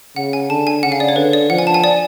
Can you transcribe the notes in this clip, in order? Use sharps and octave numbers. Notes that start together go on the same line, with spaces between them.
C#3 F#5
G#5
D3 A5
G#5
C#3 F#5
F5
D5
C#5
D3 B4
D5
F3 F#5
G#5
A5
G#5
D5